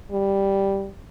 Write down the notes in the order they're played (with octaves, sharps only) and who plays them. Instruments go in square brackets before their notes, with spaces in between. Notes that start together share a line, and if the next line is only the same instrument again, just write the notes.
[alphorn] G3